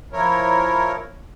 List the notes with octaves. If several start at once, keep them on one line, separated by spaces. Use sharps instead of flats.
F3 E4 A#4 C#5